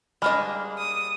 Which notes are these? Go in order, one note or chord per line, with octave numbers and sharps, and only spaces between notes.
G3 G#3 A#3 D4 D#5 B5 F6
D#6